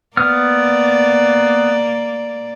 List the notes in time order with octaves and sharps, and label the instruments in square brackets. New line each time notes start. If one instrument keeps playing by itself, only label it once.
[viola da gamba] A#3 D5 [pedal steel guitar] B3 F6